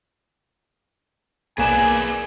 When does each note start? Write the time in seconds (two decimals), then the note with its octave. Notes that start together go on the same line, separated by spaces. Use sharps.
1.58 B1 A#3 G#4 B4 D5 G#5 E7